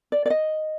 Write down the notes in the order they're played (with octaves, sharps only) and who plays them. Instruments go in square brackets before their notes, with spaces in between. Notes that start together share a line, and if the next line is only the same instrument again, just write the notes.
[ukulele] D5
D5
D#5